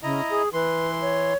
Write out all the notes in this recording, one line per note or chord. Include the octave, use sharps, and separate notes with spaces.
C#3 E4 D#5 A#5
G#4
E3 B4 C6
C#5